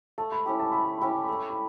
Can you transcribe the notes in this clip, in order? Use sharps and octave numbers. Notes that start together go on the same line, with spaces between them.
A3 A5
B5
C#4 E4 G4 B5
A5
A3 B5
A5
C#4 E4 G4 B5
A5
A3 B5
A5
B5